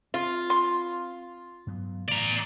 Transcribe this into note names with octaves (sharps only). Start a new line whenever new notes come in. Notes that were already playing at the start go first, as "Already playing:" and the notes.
C4 F4
C6
G2 F#3 B3
A2 E3 D5 A#5